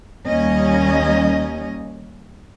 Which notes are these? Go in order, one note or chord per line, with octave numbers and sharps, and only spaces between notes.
D#2 G3 A#3 C#4 D#5